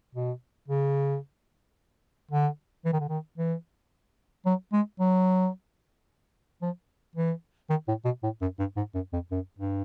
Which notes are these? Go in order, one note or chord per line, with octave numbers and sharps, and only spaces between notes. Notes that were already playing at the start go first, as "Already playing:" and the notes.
B2
C#3
D3
E3
D#3
D3
D#3
E3
F#3
G#3
F#3
F3
E3
D#3
A2
B2
A2
F#2
G2
G#2
F#2
F2
F#2
G2